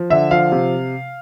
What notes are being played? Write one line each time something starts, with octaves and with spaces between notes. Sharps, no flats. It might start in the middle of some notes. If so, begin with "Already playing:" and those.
Already playing: F3
D3 E5
F3 F5
C3